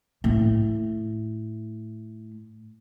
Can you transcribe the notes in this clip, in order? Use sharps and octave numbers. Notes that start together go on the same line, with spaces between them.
A2 A3